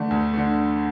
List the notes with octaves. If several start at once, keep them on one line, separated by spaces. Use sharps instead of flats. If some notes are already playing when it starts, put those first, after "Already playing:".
Already playing: D3 A3
D2
D3 A3